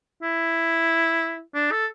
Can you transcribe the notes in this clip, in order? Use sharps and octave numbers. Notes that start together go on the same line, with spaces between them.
E4
D4
A4